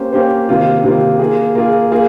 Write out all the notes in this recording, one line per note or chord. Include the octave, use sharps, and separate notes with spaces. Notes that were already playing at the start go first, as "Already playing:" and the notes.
Already playing: A#3 C#4 G4 C5
A#3 C#4 G4 C5
C3 D#3 A#3 F4
C3 D#3 A#3 F4
A#3 F4 G#4
A#3 F4 G#4
A#3 F4 G#4